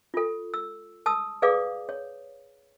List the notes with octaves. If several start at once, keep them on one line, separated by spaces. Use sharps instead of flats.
F4 A4
E6
A5 D#6 E6
G#4 B4 D5 F5 D6 D#6
C#5